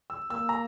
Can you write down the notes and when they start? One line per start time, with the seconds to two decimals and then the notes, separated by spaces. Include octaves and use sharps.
0.10 E6
0.30 A#3 E6
0.49 A#5